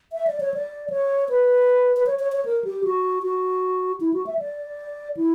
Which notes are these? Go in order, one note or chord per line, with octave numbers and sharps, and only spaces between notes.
E5
D5
C#5
D5
C#5
B4
B4
C#5
C#5
C#5
A#4
G4
F#4
F#4
E4
F#4
E5
D5
E4